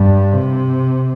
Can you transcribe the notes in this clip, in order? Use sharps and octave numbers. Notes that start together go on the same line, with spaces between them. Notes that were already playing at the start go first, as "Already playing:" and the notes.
Already playing: G2
C3